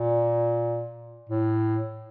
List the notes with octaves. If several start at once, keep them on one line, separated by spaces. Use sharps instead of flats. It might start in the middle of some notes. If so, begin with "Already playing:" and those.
Already playing: A#2
A2